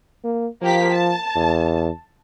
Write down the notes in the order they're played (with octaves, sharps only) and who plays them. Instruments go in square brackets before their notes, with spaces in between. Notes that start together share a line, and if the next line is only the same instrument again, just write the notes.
[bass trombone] A#3
[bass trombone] F3 [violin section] A#3 G4 B6
[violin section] A5
[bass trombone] E2